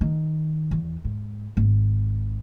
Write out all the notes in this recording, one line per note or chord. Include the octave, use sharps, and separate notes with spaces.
D#3
E2
G#2
G#1